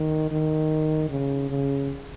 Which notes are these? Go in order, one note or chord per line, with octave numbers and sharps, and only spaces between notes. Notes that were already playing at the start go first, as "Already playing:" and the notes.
Already playing: D#3
D#3
C#3
C#3